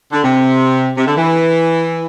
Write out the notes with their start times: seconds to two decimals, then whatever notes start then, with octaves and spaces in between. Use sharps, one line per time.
0.12 D3
0.24 C3
0.97 C3
1.07 D3
1.16 E3